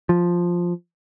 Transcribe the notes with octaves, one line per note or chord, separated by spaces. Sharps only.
F3